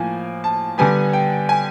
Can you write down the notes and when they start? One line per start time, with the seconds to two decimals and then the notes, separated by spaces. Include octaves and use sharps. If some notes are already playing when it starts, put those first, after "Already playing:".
Already playing: A2 F3 A#3 G#5
0.44 A5
0.78 D3 G3 B3 G#5
1.13 G5
1.49 G#5